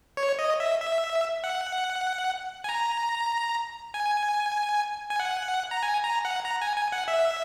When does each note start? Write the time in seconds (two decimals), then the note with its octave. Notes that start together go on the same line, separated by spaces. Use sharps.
0.17 C#5
0.39 D#5
0.60 E5
0.81 E5
1.44 F#5
2.64 G#5
2.69 A#5
3.94 G#5
5.10 G#5
5.20 F#5
5.71 A#5
5.83 G#5
6.04 A#5
6.25 F#5
6.45 A#5
6.62 G#5
6.76 G#5
6.92 F#5
7.08 E5